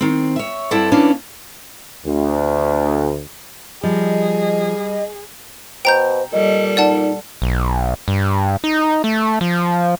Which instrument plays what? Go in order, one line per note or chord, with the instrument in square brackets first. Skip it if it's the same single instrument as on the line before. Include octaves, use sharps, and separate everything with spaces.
[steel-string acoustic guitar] D#3 C4
C#5 E5
G2 C4 E4 A4 D5 F#5
E3 A#3 C#4 D4 A4 B4
[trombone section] D2
[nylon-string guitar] F3 [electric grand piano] G3 [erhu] G#4 [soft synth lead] D#5
[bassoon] B2 [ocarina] C5 [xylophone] G5 A#5 G6
[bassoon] A#2 [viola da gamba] G3 A4 [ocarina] D#5
[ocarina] D#4 [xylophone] D5 F#5 A5
[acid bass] B1
G2
D#4
A3
F3